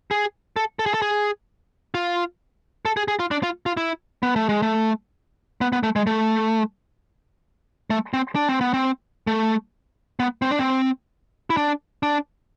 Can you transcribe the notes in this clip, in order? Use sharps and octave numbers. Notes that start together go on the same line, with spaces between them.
G#4
A4
A4
G#4
A4
G#4
F4
A4
G#4
G#4
F4
D4
F4
F4
E4
B3
A3
G#3
A3
B3
B3
A3
G#3
A3
A3
C4
D4
C4
B3
C4
A3
B3
C4
D4
C4
E4
D4
D4